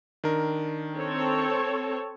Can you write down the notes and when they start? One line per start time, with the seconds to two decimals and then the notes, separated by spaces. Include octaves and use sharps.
0.24 D#3 D4 A#4
0.97 C4 A4 C#5